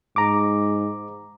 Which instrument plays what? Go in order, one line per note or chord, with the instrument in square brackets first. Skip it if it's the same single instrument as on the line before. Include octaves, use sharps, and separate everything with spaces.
[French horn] G#2 [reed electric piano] A#5 D6